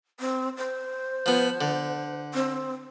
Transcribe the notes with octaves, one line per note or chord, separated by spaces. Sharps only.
C4
C5
F3 B3
D3
C4